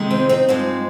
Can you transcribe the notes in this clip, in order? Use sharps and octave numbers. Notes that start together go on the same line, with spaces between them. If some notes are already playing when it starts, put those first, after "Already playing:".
Already playing: F2 C3 D#3 G#3
C4
C4 D#4
G2 F3 G#3 C4 D#4